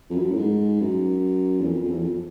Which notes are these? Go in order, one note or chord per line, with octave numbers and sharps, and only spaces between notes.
F2
F#2
A2
G#2
F#2
E2
F2
F2
E2
F2